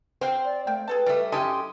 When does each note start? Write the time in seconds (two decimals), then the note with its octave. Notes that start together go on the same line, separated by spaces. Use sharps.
0.21 C4 F#4 C5 F5 G5
0.45 D5
0.67 A3 A#3 G5
0.88 G#4 A4 B4 A5
1.06 G3 A3 D5 D#5
1.32 F#2 E4 G4 A4 D#5 G#5 C6